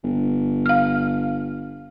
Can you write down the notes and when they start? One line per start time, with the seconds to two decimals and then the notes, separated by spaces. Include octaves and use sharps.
0.04 G1
0.66 F5 F6